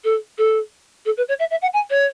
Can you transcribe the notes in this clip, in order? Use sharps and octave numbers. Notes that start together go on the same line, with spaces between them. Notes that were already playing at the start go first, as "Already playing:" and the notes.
A4
A4
A4
B4
C#5
E5
E5
F#5
G#5
C#5